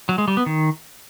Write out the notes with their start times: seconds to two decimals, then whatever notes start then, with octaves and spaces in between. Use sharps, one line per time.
0.09 F#3
0.18 G#3
0.28 G3
0.37 B3
0.46 D#3